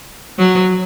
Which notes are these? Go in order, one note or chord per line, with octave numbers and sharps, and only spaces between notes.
F#3